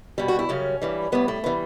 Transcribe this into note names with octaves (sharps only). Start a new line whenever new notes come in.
B2 G3
F#4
E4
F#2 C#3 G3 C#4
G2 E3 G3
A2 G3 B3
A3
E3 G3 B3